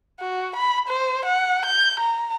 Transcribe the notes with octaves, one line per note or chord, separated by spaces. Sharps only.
F#4
B5
C5
F#5
G6
A#5